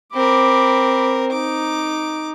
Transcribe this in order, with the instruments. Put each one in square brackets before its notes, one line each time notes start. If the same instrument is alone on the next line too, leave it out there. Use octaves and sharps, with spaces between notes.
[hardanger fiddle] C4 A#4 [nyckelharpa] B5 D6
[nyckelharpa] D#4 [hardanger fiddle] D6